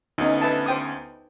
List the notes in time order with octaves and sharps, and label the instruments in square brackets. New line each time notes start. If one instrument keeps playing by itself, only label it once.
[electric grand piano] D2 B3 C#4 [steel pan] D#4 D#5
[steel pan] B4 E5 A5
C5 G5 D#6